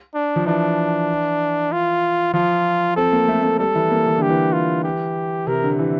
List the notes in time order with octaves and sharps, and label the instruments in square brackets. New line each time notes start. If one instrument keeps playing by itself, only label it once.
[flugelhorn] D4
[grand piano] F3
[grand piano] E3 [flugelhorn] D4
[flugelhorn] F4
[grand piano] F3 [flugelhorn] F4
[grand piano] C4 [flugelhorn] A4
[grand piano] A#3
A3
A3
[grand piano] G3 [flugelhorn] A4
[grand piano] E3
A#3
E3
[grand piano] D3 [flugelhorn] G4
[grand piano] E3
[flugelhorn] F4
G4
[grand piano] C3 [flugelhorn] A#4
[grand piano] D3
E3